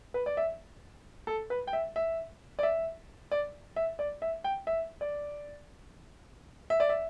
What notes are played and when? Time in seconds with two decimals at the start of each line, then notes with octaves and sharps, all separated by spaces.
0.14 B4
0.26 D5
0.37 E5
1.27 A4
1.50 B4
1.67 G5
1.73 E5
1.96 E5
2.59 D5
2.63 E5
3.31 D5
3.76 E5
3.99 D5
4.22 E5
4.44 G5
4.67 E5
5.01 D5
6.70 E5
6.80 D5
6.89 E5